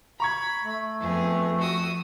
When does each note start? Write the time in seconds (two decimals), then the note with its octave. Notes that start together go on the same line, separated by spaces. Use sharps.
0.20 A#5 B5 C#6 G#6
0.63 A3
1.01 F2 B3 G#4
1.58 F#4 D#6